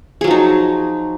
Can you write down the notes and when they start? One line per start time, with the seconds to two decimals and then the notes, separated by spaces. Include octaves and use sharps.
0.21 G#4
0.24 F#3
0.27 F3
0.31 D#4